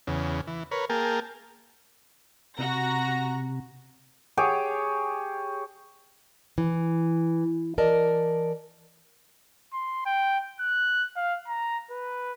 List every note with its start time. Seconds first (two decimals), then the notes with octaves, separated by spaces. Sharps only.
0.07 E2 C#3
0.47 E3
0.71 A#4 B4 C#5
0.90 A#3 G#4 A#4 G5 A5
2.58 C3 F#4 A#5 A#6
4.37 G4 G#4 C#5
6.58 E3
7.78 E3 A#4 D5 D#5 A5
9.73 C6
10.06 G5
10.60 F#6
11.16 F5
11.48 A#5
11.90 B4